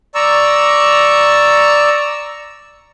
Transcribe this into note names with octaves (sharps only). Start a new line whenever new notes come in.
D5 A#5 C#6 E6